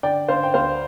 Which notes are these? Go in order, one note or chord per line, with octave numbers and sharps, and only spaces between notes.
D3 D5 G5
D3 C5 F5
G5
D2 C5 F5